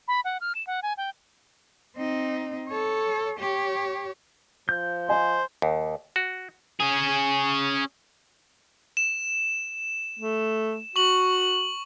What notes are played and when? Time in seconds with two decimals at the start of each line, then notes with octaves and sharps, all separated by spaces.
0.08 B5
0.25 F#5
0.41 F6
0.55 E7
0.67 F#5
0.83 G#5
0.97 G5
1.96 C4 D#4
2.67 A4 C#5
3.39 G4 C#5
4.69 F3 G6
5.09 C5 D#5 G#5
5.62 D#2
6.16 F#4
6.80 C#4 G#4
8.97 E7
10.19 A3
10.96 F#4 C#6 F#7